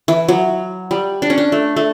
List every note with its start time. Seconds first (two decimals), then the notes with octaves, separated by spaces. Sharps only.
0.08 E3
0.28 F#3
0.91 G3
1.22 D4
1.30 C#4
1.38 D4
1.52 A3
1.76 A3